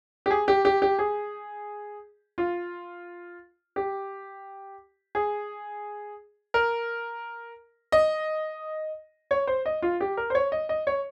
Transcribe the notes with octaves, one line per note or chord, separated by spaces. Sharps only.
G4
G#4
G4
G4
G4
G#4
F4
G4
G#4
A#4
D#5
C#5
C5
D#5
F4
G4
A#4
C5
C#5
D#5
D#5
C#5